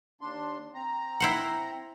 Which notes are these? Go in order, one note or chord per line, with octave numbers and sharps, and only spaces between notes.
D#2 D4 C6
C4 A#5
E4 C5 F#5